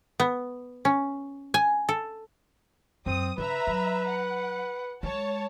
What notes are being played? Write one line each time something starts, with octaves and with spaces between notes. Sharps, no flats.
B3
C#4
G#5
A4
F#2 C4 D#6
C#3 B4 E5 A#5 B5
F#3
F#5
G#3 C#5 A5